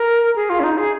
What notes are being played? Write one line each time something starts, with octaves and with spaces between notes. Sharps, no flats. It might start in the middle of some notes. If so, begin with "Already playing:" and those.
Already playing: A#4
G#4
F4
C#4
D#4
G#4